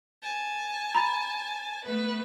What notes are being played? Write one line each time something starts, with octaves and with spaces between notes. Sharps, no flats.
G#5 A5
A#5 B5 A6
A3 B3 B4